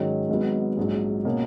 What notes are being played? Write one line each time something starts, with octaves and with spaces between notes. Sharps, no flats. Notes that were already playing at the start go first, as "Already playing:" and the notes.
Already playing: G#2 D#3 F#3 C#4
G#1 G#2 F#3 B3
A#1 G#2 F#3
B2 A#3 C#4